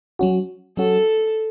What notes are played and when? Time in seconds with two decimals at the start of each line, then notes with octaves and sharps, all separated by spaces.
0.19 F#3 C#4 F#4
0.77 F#3 C#4 F#4 A4